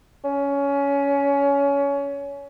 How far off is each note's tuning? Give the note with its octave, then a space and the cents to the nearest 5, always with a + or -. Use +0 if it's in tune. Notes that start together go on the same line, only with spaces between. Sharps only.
C#4 +20